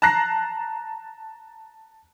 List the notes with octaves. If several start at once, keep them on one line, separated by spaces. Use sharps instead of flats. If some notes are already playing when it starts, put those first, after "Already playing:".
A5 A#5 F#6 A#6 C7